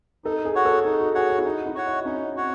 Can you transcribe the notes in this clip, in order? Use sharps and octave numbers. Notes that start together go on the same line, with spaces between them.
D#4 A4
G#4
F#4 C#5 F#5
A4
D#4 G#4
F#4
F#4 G#4 C#5 F#5
G#4
E4
D#4 F#4
E4
F#4 C#5 F#5
D#4
C#4 D#4
C4 F#4 C#5 F#5